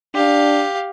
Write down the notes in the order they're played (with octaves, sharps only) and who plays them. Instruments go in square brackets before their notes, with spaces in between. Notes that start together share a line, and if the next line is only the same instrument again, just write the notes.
[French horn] D4 [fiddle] G4 F5